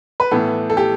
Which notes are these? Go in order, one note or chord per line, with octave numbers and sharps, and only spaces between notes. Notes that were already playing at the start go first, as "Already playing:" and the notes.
B4
A2 E3 B3 A4
A4
G4